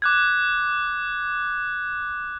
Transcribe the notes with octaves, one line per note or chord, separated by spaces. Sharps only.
D6 F#6 G#6